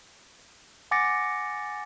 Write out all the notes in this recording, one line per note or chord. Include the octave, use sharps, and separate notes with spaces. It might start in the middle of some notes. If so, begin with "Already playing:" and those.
F#5 G#5 D6 A6 A#6 C#7